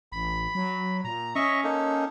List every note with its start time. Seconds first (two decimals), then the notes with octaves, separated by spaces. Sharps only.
0.12 A1 B5
0.55 F#3
1.04 A#2 A#5
1.35 C#4 D#5 E5 C#6
1.64 A#3 D#4 A4